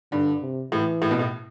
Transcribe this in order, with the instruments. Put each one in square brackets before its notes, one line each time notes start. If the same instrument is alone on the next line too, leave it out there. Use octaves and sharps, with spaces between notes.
[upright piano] G2 [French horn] D3
[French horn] C3
[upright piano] A2 [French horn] E3
[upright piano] A2
B2
A2